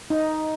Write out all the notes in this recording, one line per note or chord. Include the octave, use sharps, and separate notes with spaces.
D#4